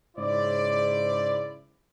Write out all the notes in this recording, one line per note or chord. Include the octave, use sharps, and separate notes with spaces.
G#2 C#3 E4 C5 D5